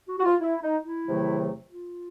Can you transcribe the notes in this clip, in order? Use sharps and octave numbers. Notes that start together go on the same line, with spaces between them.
F#4
F#4
F4
E4
D#4
E4
E2 C3 D#3 F#3 A3
F4